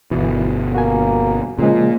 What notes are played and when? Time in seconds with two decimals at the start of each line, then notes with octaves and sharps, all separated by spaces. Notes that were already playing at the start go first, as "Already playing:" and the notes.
0.11 G1 B2 E3
0.75 A#3 F#4 G#5
1.59 A#2 C#3 F3 G#3